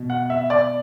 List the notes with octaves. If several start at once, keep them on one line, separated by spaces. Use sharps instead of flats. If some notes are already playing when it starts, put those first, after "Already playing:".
Already playing: B2
F#5
E5
D5